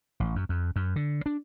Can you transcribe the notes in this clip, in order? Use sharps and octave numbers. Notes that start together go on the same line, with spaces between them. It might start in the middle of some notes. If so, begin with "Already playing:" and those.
A1
F#2
F2
F#2
D3
D4